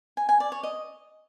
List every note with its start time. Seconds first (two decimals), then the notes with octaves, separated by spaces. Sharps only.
0.17 G#5
0.29 G#5
0.40 D5
0.52 C#5
0.63 D#5